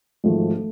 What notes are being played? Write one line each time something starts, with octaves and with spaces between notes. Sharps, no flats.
G#1 G#2 F3 A3
A3